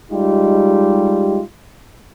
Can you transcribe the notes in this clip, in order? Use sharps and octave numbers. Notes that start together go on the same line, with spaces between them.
G3 G#3 D#4 F4 G4